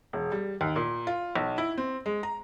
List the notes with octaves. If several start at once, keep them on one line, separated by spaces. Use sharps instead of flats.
E1
G3
D#2
A#2
F4
B1
E4
C4
G#3
A#5